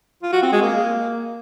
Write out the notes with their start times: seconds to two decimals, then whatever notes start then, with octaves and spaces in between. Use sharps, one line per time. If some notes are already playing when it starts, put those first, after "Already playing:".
0.23 F4
0.33 F#4
0.43 C4
0.52 G#3
0.62 A#3